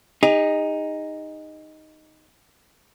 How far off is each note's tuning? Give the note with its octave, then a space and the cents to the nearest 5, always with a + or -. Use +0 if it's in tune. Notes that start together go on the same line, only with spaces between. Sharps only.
D#4 +0 G#4 -40